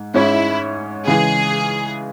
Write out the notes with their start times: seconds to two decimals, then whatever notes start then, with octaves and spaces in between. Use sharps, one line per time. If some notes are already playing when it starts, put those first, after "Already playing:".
Already playing: G#2
0.14 G#2 G#3 C#4 E4
1.07 C#3 E3 G#3 G#4